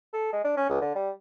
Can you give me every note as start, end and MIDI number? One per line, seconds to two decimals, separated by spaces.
0.13 0.32 69
0.33 0.41 56
0.45 0.55 62
0.57 0.65 61
0.70 0.81 37
0.82 0.95 50
0.95 1.10 55